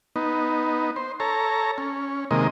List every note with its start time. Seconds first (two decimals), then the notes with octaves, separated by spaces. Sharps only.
0.16 B3 D#4
0.96 C5
1.20 A4 C#5 A#5
1.78 C#4
2.31 C3 D#3 G#3 A#3 D#5